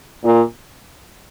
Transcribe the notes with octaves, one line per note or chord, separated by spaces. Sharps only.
A#2